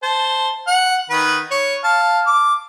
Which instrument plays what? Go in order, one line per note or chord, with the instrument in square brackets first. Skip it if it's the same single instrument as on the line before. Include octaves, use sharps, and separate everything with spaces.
[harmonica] C5 A5
F#5
D#3 B4
C#5
F5 A5
D6